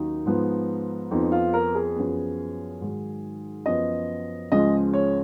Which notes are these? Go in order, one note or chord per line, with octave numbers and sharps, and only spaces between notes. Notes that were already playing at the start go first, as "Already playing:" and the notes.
Already playing: D#2 D#3 F#3 A#3 C#4 D#4
G#2 F3 B3
F2 F3 B3 D#4
F4
A#4
G#4
F#2 F3 B3
G#2 D#3 F#3
F#2 F3 B3 D#5
C#2 C#3 F3 G#3 D#5
C#5